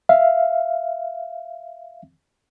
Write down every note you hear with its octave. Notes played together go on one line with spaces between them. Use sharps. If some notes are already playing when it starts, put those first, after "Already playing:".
E5 F5